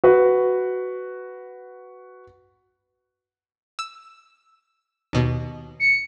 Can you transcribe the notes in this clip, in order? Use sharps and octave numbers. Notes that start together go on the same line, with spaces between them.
F#4 B4
E6
D#2 B2
C#7